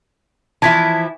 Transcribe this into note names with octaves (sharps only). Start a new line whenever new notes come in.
E3 F3 E4 A5 G#6 B6